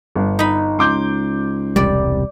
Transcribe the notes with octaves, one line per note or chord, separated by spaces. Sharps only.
G1
D#4 B5
C#2 C6 D6 G6
E1 C2 G3 D5